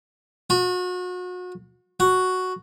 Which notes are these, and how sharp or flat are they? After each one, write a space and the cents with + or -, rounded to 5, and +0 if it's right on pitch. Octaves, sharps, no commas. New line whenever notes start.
F#4 -35
F#4 +0